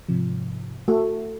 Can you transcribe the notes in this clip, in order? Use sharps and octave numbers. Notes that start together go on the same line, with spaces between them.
G#2 C3 F3
A3 F#4